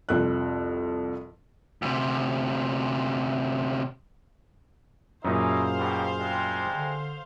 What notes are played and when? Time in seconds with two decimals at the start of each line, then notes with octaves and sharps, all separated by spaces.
0.09 C2 F2 F#6
1.82 D2 C3
5.25 F#2 A#2 C#4 D#4 E4 G#4 C5 F5
5.78 B2 D#3 G3
6.18 C3 G3 G#3
6.75 D3